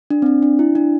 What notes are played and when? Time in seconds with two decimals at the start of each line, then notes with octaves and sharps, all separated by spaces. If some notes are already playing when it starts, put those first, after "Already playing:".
0.10 D4
0.22 C4
0.26 D4
0.43 D4
0.59 E4
0.75 D4